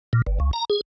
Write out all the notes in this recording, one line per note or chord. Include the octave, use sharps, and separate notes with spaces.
A#2
G1
C#2
A#5
G#4